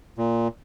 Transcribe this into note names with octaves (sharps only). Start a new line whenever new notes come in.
A#2